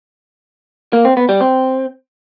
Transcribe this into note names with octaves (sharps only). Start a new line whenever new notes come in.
A#3
C4
B3
G3
C4